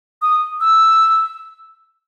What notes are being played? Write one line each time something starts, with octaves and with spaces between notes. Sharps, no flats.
D#6
E6